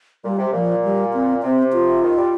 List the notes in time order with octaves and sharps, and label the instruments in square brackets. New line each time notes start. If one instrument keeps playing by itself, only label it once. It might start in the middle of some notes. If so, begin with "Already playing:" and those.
[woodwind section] A#2 [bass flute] G3
[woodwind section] C3
[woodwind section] A#2 [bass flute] F3
[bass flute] G3
C4
[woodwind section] C3 [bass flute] C4
[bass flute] F4
[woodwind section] D#3
G3